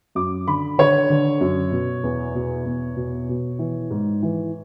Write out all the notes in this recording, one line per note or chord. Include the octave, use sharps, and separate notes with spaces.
F#2 D6
D3 B5
D3 C#5
D3
F#2
B2
E2
B2
E2
B2
B2
E3
G#2
E3